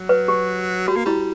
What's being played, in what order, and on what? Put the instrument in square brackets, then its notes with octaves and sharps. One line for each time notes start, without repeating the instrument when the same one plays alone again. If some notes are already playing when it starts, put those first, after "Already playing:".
Already playing: [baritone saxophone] F#3
[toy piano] B4
G4
[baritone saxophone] G3 [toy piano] F#4
[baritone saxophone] A#3
[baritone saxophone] G3 [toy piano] E4